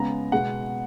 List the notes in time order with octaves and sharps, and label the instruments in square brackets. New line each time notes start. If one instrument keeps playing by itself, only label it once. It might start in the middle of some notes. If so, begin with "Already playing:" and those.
Already playing: [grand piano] C#3 G#3 B3 A#5
B2 G#3 B3 F#5